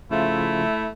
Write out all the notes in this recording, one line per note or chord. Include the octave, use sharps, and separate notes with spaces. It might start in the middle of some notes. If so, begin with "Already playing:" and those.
C#3 F3 A3 E4 F4